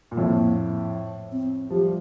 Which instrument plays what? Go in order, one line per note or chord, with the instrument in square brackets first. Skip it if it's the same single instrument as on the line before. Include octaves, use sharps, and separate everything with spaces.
[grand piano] A#2
[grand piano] F2 A2 [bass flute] A#3
[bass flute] C4
[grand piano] F3 [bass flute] G4
[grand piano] G3